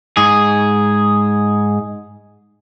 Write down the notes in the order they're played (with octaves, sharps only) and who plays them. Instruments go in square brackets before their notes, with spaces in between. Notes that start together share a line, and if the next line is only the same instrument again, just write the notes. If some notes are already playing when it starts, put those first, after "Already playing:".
[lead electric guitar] G#2 G#4